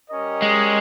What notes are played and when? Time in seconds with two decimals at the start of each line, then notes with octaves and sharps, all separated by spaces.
0.10 G3 C#4 G4 A#4 D#5
0.42 G#3